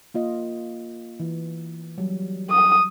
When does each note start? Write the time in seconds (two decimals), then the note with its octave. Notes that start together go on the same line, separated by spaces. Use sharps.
0.14 A#3 F4 D#5
1.20 E3
1.98 F#3 G3
2.50 D#6